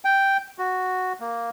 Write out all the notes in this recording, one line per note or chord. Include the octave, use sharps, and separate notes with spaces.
G5
F#4
A#3